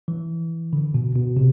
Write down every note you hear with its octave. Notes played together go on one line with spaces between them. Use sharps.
E3
D3
B2
B2
C3